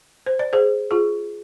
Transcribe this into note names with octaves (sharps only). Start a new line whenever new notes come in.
C5
D5
G#4 C5
F4 G#4